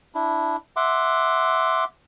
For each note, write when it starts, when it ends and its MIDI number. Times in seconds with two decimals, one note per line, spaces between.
0.15 0.56 62
0.15 0.56 64
0.76 1.84 76
0.76 1.84 78
0.76 1.84 84
0.76 1.84 86